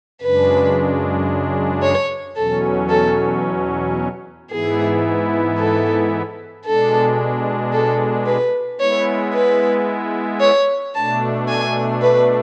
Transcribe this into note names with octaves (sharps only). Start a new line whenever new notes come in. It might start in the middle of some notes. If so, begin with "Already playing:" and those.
F#2 C#3 G#3 D4 B4
C#5
E2 B2 F#3 C#4 A4
A4
G#2 E3 B3 E4 G#4
A4
B2 G#3 D4 A4
A4
B4
G#3 B3 E4 C#5
B4
C#5
B2 A3 D4 A5
G#5
B4